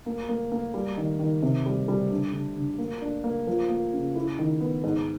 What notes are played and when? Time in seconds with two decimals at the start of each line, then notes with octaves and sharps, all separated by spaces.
0.06 A#3
0.29 A#3
0.52 A#3
0.74 G3
0.97 D#3
1.19 D#3
1.42 C3
1.66 G3
1.88 G3
2.10 D3
2.33 D3
2.57 D3
2.78 A#3
3.01 D4
3.24 A#3
3.47 F3
3.69 A#3
3.93 C#3
4.15 E4
4.39 D#3
4.60 B3
4.83 G#2